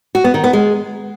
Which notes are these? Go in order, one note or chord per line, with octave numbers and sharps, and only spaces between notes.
F#4
B3
D#3
B3
G#3